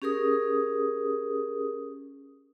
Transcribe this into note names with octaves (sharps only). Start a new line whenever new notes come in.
C#4 G4 G#4 A#4 D#6